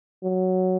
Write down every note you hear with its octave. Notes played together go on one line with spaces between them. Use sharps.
F#3